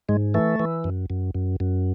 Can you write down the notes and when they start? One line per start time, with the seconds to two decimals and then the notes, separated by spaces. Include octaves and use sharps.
0.09 G#2 G#3
0.34 E3 A3
0.60 E3
0.84 F#2
1.10 F#2
1.35 F#2
1.60 F#2